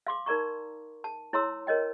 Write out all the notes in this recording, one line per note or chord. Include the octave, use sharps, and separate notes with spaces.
F5 C6 D6
D#4 A#4 D5 A#5 C#6
A5
E4 C#5 A#5 C6 E6
A#4 C#5 D#5 G5